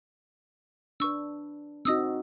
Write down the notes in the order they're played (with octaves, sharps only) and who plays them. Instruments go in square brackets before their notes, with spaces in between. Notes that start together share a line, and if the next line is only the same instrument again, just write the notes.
[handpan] D4 B4 [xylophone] C#6 E6
[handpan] C4 D#4 F#4 [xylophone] D#5 D#6 E6